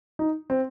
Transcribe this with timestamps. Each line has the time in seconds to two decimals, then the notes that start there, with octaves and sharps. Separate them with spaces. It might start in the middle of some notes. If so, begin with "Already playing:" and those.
0.19 D#4
0.50 C4